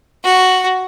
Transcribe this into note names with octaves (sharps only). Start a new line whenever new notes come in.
F#4